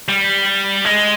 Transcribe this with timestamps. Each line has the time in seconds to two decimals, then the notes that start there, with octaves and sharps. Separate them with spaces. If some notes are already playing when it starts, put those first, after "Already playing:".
0.08 G3
0.85 G#3